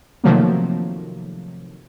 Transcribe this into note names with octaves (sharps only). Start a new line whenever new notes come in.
C3 D#3 F3 F#3 A3 A#3